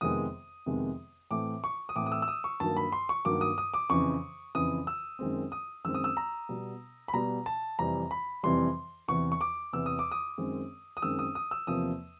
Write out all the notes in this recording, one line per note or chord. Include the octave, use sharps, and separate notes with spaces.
F2 C3 D#3 G#3 B3 D#6
F2 C3 D#3 G#3 B3
A2 E3 A3 C4 D6
C#6
D#6
A2 E3 A3 C4 D6
D#6
E6
E6
D#6
C#6
G2 D#3 F#3 A#3 A5
B5
C6
C#6
G2 D#3 F#3 A#3 D6
D#6
D#6
D6
F2 C#3 E3 C#6
F2 C#3 E3 D#6
E6
F#2 D#3 G#3 C4
D#6
F#2 D#3 G#3 C4 E6
D#6
E6
A#5
B2 G3 B3
B5
B2 G3 B3 A#5
A5
F2 C3 E3 G3 A#5
B5
F2 C3 E3 G3 C6
E2 C3 E3 C#6
C#6
D6
E2 C3 E3 E6
D#6
D6
D#6
F#2 D#3 G#3 C4
D#6
F#2 D#3 G#3 C4 E6
D#6
D#6
E6
E2 C3 F3 A#3 D#6